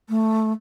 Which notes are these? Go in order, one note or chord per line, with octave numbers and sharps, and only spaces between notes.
A3